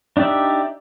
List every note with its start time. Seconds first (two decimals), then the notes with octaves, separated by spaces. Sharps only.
0.17 D4 D#4 G4 D5 E5